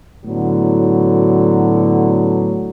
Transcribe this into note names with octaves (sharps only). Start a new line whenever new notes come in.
A2 D3 F#3 B3